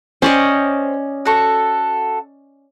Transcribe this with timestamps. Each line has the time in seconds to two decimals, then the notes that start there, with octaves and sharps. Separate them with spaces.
0.22 C#4 C5 D5 D#5 G5 C#6
1.25 F#4 A4 C#6